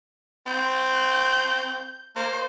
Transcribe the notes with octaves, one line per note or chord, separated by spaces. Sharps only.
C4 G6
A#3 C5